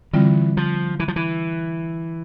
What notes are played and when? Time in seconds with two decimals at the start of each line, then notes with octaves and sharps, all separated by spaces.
0.13 D3 E3 G3 C4 F4
0.57 F3
1.00 E3
1.08 F3
1.16 E3